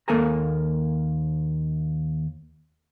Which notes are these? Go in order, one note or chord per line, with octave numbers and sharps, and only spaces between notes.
D#2 A#3 A4 A#4 G#5 A#5